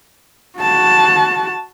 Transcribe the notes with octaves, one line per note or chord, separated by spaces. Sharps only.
F#4 A5